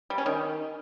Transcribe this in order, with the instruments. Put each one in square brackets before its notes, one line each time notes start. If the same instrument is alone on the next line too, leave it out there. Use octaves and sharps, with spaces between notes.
[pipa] G3
C#4
D#3